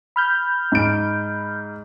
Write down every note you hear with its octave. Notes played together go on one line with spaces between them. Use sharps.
B5 F6 G6
G#2 D7